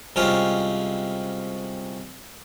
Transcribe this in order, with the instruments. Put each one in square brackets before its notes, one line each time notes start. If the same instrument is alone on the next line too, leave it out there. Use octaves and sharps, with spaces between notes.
[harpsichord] C2 C3 G#3 C#4 F4 F5